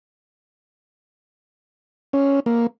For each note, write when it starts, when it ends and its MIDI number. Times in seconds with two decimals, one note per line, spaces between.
2.13 2.40 61
2.46 2.67 58